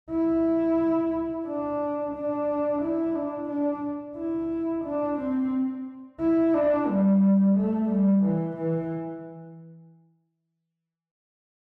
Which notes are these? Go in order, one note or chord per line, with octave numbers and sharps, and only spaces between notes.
E4
D4
D4
E4
D4
D4
E4
D4
C4
E4
D4
G3
A3
G3
E3
E3